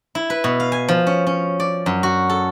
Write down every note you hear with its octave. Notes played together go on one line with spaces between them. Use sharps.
E4
B4
B2
F5
G#5
F3
C#4
C#4
D5
F#2
F#4
A4